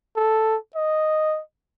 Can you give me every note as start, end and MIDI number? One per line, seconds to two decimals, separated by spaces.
0.16 0.56 69
0.75 1.41 75